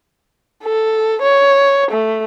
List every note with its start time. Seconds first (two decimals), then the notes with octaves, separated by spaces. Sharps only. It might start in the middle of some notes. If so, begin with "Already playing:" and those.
0.64 A4
1.22 C#5
1.91 A3